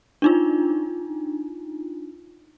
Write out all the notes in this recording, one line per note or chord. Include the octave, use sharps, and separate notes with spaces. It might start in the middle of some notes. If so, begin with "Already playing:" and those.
D4 D#4 F4